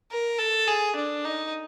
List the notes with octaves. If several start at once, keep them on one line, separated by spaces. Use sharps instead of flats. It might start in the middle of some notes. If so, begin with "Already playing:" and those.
A#4
A4
G#4
D4
D#4